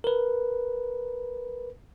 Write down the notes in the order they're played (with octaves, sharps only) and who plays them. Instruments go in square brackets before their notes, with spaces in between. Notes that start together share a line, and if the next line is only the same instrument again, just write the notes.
[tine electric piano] A#4 B4